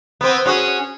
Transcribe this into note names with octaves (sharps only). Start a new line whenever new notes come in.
B3 C4
C#4 F#4 G#4